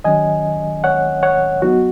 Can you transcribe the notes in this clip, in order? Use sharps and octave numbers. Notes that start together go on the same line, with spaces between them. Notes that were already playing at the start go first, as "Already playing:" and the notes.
D#3 F#3 C#4 D#5 G#5
C#5 F#5
C#5 F#5
F#3 B3 D#4 F#4